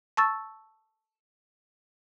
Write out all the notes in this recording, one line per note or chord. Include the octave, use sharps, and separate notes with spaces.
A5 C#6 E6 A6